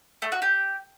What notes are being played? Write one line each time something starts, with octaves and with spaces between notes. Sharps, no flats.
A3
F#4
G4